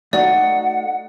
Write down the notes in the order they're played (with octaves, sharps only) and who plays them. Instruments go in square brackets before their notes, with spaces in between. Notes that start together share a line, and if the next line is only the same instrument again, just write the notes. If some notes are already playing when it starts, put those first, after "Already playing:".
[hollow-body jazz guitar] A3 D#4 F#4 [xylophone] D5 [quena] F#5